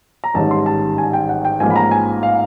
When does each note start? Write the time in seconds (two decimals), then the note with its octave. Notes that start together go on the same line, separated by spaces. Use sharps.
0.24 A#5
0.34 A1 G#2 D#3 G3 A5
0.51 C6
0.66 A5
0.98 G#5
1.13 G5
1.29 F#5
1.45 G5
1.60 A1 G#2 F3 A#3 G#5
1.70 B5
1.76 A#5
1.91 G#5
2.23 F5